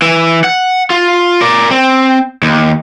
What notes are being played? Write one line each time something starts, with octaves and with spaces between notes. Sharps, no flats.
E3
F#5
F4
A#4 D5
C4
D#2